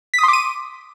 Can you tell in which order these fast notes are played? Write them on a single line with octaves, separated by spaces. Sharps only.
B6 D#6 C6 D6 D#7